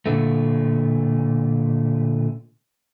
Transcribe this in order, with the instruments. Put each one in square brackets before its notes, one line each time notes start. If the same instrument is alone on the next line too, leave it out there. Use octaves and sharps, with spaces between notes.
[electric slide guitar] A#2 D3 A3